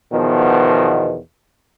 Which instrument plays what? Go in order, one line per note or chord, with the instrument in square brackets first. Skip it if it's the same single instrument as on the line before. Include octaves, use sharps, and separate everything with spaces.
[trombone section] E2 B2 D#3 F3